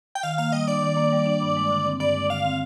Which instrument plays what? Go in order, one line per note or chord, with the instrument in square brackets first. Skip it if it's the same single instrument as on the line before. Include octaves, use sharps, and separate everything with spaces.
[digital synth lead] G5
[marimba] D#3 [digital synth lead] F5
[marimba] A#3 [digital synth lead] F5
[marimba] G3 [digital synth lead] D#5
[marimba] D4 [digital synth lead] D5
[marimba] D#3
A#3
G3
D4
G2
G#3
D3
C4
[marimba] G2 [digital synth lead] D5
[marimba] G#3
[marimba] D3 [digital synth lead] F5
[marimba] C4